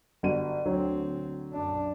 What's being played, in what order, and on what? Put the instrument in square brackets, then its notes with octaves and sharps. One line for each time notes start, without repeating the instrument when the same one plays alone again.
[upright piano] G1 F#4 D#7
[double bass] D2 C4 [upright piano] D3 F#3
[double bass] F#2 D4